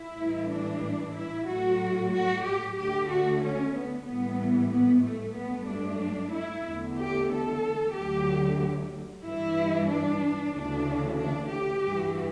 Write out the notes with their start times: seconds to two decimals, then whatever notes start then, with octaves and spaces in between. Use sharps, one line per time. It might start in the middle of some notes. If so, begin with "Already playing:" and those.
Already playing: E4
0.18 A2 E3 G3
0.50 D4
1.15 E4
1.47 A2 F#3 A3 F#4
2.13 F#4
2.44 G4
2.77 D2 D3 A3 G4
3.09 F#4
3.42 C#4
3.75 B3
4.07 A2 E3 G3 B3
4.71 B3
5.04 A3
5.36 G2 F#3 A3 B3
5.68 D4
6.32 E4
6.65 E2 D3 A3
6.98 G4
7.30 A4
7.94 D2 D3 F#3 A3 G4
9.24 G2 E3 G3 E4
9.89 D4
10.54 D2 C#3 E3 A3 D4
11.18 D4
11.51 G4
11.83 G2 E3 G3